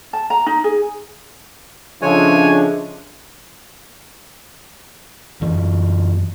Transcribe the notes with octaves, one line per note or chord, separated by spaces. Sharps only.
A5
A#5
D#4
G#4
C#3 F3 G#3 A3 D4 C#5 G#5
F#2 E3